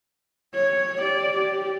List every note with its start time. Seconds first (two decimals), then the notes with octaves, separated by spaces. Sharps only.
0.54 C#5
0.98 G4 D5
1.36 G4